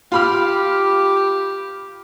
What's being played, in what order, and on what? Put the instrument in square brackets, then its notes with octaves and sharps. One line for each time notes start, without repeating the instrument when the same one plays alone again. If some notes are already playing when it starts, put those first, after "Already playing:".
[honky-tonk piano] F4 B5 F6 [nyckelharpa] G4